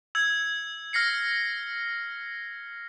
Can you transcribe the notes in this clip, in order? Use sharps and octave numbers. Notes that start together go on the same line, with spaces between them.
E6 G#6
F6 A#6 C7 C#7